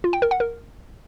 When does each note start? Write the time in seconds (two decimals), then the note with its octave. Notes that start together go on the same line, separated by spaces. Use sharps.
0.04 F4
0.13 G5
0.22 A#4
0.31 F#5
0.40 A#4